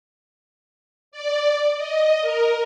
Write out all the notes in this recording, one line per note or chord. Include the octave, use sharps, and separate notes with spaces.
D5
D#5
A#4